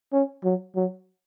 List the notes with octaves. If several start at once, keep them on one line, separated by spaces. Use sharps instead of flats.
C#4
F#3
F#3